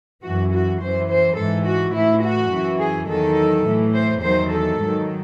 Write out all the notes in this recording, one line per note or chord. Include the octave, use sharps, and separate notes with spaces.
F#2 E3 F#4
F#4
F#2 E3 C5
C5
G#2 E3 A4
F#4
A2 E3 E4
F#4
F#2 E3
G#4
E2 D#3 F#3 A4
A2 E3
C5
E2 D#3 F#3 C5
A4
G#2 D#3 F#3